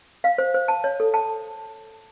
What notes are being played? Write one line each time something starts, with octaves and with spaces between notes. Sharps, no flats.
F5
C5
C5
A5
C#5
A4
A5